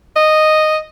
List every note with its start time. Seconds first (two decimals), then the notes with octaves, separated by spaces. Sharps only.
0.16 D#5